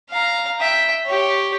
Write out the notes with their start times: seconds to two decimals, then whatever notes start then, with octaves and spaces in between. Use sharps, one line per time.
0.10 F5 A#5
0.59 E5 G5
1.06 G4 C#5